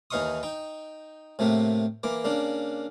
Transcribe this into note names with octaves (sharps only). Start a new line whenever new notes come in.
D#2 E3 D#4 F5 C#6 D#6
D#4 G5
A2 C3 A3 A#3
E3 A#3 D6
C#3 A#3 D4